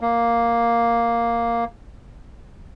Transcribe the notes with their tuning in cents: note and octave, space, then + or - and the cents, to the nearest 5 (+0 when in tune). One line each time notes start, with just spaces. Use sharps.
A#3 +0